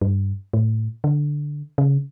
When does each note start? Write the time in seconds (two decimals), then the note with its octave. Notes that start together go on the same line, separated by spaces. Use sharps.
0.01 G2
0.53 A2
1.04 D3
1.78 C#3